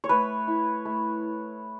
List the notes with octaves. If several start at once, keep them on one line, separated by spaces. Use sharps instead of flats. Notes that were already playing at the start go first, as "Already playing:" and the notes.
C#5
A3 B4
E4
A3